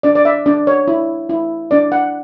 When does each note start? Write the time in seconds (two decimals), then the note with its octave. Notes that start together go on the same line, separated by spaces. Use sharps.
0.03 D4 D5
0.15 D5
0.25 E5
0.46 D4 D5
0.67 C#5
0.88 E4
1.30 E4
1.71 D4 D5
1.92 F#5